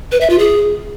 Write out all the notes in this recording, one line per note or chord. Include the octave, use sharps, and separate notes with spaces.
B4
E5
F4
G#4